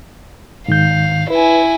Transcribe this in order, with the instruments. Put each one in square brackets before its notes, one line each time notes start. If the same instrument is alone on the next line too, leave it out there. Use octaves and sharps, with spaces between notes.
[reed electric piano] G#2 D#3 G6 [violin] F5
[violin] E4 G#5 [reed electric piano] B4